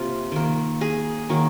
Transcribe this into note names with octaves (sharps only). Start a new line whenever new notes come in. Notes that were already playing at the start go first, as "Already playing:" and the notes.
Already playing: C3 A#3 F4
D#3 A#3
G#4
D#3 F#3 A#3